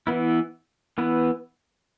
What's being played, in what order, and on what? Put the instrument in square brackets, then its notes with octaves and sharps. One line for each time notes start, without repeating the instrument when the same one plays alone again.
[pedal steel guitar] E3 B3 E4
E3 B3 E4